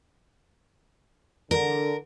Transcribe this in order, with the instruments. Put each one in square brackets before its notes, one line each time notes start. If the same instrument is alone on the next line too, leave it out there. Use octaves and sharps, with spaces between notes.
[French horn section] D3 [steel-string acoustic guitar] A#4